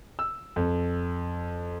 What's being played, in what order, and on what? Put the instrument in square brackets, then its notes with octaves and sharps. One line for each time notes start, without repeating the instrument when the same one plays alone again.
[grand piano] E6
F2